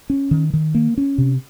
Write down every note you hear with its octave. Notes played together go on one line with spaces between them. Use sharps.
C#4
D#3
D#3
A#3
C#4
C3